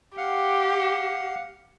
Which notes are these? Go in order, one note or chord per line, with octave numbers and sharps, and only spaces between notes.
G4 F5 F#5